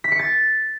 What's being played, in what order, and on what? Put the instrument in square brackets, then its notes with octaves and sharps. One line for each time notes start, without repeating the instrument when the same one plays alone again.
[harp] B6
C#7
A6